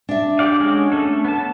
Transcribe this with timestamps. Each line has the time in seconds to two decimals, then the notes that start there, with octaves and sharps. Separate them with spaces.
0.09 D4 E5
0.39 G4 D5 F5
0.60 G#3 C#4 F#4
0.92 A3 C#4 A4
1.25 B3 A5